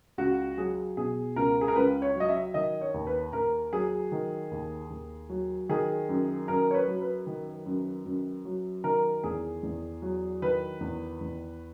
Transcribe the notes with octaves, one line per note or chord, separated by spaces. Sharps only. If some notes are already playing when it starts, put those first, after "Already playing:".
C#2 F#4
F#3 G#4
B2 G#4
C#2 A#4
G#4
A#4
C#2 B4
C#5
F#3 D#5
E5
D#3 D#5
C#5
D#2
B4
D#2 A#4
F#3 G#4
D#3
D#2
D#2
F#3
D#3 G#4
F#2
F#2 A#4
C#5
B4
F#3
B4
D#3
F#2
F#2
F#3
D#3 A#4
E2 G#4
E2
F#3
D#3 B4
E2
E2